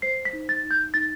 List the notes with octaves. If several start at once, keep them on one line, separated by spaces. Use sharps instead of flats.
C5 C7
B6
D#4
A6
D#4
G6
D#4 A6